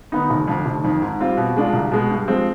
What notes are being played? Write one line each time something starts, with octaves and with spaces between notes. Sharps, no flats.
D#3 B3 D#4
F1
F2 D3
F1
F2 D#3
G#2
G3 C4 F4
B2
G#3 D4 F4
C2
B2 G#3
G2
F3 G#3 C4